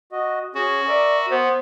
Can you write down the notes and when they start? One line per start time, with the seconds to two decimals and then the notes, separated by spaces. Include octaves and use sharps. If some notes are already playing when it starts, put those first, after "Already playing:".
0.12 F#4 D#5
0.55 C#4 F#4 G#4
0.88 A#4 D5 E5
1.31 B3 C5